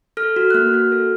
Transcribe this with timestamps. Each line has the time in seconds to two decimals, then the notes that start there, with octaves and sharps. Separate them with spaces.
0.17 A4 F6
0.36 F#4
0.50 F#6
0.54 A#3 F6
0.74 F#4
0.92 A4